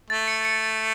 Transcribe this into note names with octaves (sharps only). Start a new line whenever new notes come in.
A3 A6
C#7
C#7